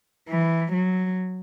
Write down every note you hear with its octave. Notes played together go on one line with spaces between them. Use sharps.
E3
F#3